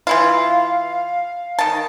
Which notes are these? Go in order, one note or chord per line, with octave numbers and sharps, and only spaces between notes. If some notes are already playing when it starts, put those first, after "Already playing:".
E3 E4 F4 F5
D#3 A5